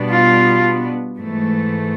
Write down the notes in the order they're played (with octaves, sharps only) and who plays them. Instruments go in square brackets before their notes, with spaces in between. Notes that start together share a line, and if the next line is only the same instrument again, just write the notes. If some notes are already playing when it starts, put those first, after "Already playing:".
Already playing: [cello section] B2 G3 B3 D4
F4
G#2 E3 A3